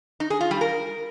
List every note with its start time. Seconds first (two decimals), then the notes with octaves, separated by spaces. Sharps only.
0.20 D#4
0.30 G#4
0.41 F4
0.51 G3
0.61 A#4